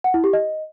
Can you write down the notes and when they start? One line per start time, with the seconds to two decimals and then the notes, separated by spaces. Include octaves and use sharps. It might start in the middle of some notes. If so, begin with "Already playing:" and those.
0.04 F#5
0.14 E4
0.24 G4
0.33 D#5